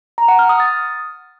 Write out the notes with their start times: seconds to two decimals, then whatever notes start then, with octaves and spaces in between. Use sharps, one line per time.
0.18 A#5
0.28 F#5
0.39 F6
0.49 D#6
0.60 A6